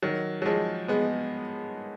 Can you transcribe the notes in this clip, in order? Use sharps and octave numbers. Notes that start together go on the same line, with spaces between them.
D#3 F#3
F#3
F3 G#3
G#3 B3